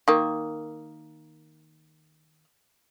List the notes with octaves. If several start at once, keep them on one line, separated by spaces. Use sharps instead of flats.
D#3 A#3